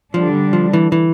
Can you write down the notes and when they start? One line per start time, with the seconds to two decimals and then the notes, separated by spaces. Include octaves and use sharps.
0.14 D3 F3 G3 D4
0.53 F3
0.73 E3
0.92 E3